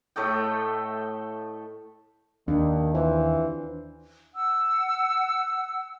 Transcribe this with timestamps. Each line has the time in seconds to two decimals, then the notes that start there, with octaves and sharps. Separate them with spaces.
0.16 A2 A3 D#5 G5
2.48 D#2 D#3 D4
2.94 E3 F4 C5
4.35 F#5 E6